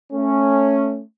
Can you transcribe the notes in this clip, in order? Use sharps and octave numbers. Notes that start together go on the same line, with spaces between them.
A3 C#4